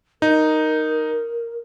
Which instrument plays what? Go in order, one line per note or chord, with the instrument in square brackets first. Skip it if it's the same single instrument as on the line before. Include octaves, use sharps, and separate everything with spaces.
[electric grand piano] D#4 [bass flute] A#4